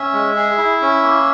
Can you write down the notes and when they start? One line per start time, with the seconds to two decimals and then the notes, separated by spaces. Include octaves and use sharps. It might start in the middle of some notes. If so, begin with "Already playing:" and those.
Already playing: C#4 E5
0.13 G#3
0.36 G#4
0.58 E4
0.81 C#4
1.03 A#3